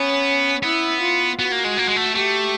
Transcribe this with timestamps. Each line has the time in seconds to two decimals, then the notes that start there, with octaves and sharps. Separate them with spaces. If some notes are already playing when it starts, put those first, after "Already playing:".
Already playing: B3 C#4
0.63 B3 E4
1.01 F4
1.39 B3 F#4
1.52 A#3
1.64 G#3
1.78 A#3
1.89 G#3
1.96 A3
2.15 A3 G4